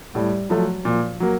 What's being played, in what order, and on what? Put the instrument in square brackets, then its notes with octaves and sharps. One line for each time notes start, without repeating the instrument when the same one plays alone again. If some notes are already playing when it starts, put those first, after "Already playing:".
[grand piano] A2 [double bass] G3
[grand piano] F3 A3 [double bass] F#3
[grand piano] A#2 [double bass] F3
[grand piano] F#3 A#3